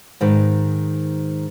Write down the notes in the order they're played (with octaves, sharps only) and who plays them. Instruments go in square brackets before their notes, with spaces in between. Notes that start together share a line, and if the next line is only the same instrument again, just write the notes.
[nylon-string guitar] G#2 D#3 B4